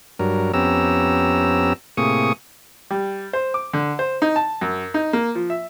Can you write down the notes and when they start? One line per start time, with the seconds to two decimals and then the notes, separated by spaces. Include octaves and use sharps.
0.19 G2 F#3 A#4
0.54 F2 B3 C#4 G4 A#5 E6
1.97 A2 C3 A#3 G#4 C#6 D#6
2.90 G3
3.33 C5
3.54 D6
3.73 D3
3.99 C5
4.22 D#4
4.36 A5
4.61 F#2
4.94 D#4
5.13 A#3
5.35 F3
5.50 E5